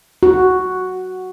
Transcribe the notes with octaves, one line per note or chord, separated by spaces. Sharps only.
F#4